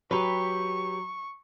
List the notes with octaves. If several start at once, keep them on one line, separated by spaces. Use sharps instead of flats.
F#3 G4 B4 C#6